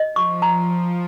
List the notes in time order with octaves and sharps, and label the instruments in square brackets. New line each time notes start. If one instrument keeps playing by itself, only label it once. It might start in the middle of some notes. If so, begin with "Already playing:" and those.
Already playing: [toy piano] D#5
[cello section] F3 [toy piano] C#6
[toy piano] A#5